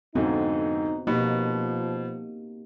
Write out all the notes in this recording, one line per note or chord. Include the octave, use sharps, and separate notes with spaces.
F2 G#2 D3 B3 C4 D#4 F#4
B2 F3 A#3 D#4 G4